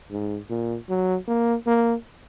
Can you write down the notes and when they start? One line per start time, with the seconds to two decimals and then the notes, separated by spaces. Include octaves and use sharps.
0.11 G#2
0.50 A#2
0.89 F#3
1.28 A#3
1.67 A#3